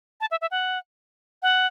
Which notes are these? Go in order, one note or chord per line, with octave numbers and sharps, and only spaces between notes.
A5
E5
E5
F#5
F#5